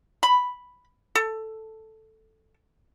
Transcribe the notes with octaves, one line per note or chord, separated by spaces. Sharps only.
B5
A4